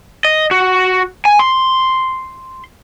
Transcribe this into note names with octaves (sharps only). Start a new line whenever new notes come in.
D#5
F#4
G#5
C6